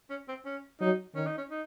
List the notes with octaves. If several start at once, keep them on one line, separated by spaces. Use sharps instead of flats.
C#4
C4
C#4
F#3 D#4
D#3 C#4
D#4
C#4
D#4